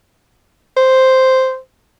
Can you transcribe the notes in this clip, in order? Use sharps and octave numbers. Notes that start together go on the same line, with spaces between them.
C5